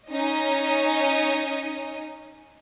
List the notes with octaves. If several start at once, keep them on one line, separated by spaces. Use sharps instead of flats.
C#4 D#4 D#5